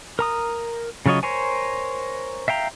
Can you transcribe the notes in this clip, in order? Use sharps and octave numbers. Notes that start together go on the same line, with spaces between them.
A#4 A#5 D#6
C#3 F#3 F4 C#5 D#5
A#4 C5 C#5 G#5
E5 F5 G5 A#5